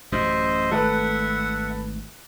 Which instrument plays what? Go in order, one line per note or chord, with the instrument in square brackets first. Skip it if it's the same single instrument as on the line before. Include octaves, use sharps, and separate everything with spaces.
[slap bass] A1 F#2 [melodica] C5 D#5 E5
[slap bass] G#1 A3 [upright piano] A4 B4 F#6 [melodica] E5 F#5